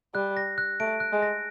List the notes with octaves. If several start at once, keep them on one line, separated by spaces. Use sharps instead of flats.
G3 F#6
A#6
F#6
A3 D7
F#6
G#3
A#6